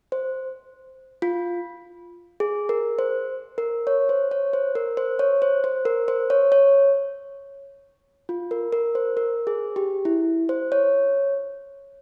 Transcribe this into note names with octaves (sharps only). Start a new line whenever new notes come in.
C5
F4
G#4
A#4
C5
A#4
C#5
C5
C#5
C5
A#4
C5
C#5
C5
C5
A#4
C5
C#5
C#5
F4
A#4
A#4
C5
A#4
G#4
G4
E4
C5
C#5